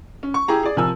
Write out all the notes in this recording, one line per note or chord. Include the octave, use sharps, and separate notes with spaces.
C#4
C#6
E4 G4 G#4 A#5
G#4 D5
C3 F3 A#4 G#5 E6